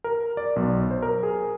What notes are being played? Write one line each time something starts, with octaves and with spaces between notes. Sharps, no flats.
A#4
D5
B1
C5
A#4
G#4